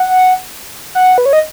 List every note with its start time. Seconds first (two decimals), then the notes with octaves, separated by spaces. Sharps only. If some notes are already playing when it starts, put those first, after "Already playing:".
Already playing: F#5
0.95 F#5
1.18 B4
1.26 C#5
1.33 D#5